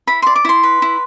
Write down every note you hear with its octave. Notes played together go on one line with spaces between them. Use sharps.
E4 B5
D5 C6
D6
E4 C6
B4
E4